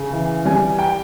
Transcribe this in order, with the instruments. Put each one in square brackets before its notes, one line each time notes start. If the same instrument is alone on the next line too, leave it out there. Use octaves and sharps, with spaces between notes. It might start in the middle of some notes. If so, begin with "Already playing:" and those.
Already playing: [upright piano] C#3
E3
G3 G#5
G5